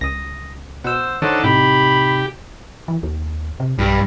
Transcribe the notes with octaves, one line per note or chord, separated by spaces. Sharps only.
C#2 D#6 A#6
B2 C5 F#5 E6
D#3 D4 D#4 A4 C5 C#5 F#5
A2 C3 D#4 G4 B5
E3
D#2
C3
B1 G2